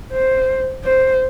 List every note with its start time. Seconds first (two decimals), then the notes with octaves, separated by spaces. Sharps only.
0.12 C5
0.85 C5